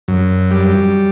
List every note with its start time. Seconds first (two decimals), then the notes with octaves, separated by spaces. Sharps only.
0.08 F#2
0.51 G3